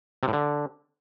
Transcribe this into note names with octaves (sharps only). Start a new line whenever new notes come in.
C3
A2
D3